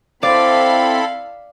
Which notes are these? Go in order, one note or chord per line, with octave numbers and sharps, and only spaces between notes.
C4 E4 A4 D5 F5 B5